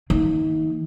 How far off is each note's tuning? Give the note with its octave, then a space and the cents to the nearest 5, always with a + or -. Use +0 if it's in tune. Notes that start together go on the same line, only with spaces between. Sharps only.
D#3 +30 A#3 +0